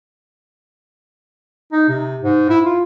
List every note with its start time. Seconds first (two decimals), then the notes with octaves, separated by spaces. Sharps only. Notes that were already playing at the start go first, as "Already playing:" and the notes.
1.72 D#4
1.89 C3
2.22 G#2
2.49 E4
2.65 F4